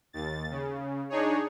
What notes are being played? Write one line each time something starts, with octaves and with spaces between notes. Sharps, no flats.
D#2 A6
C#3
D4 D#4 G#4 C#5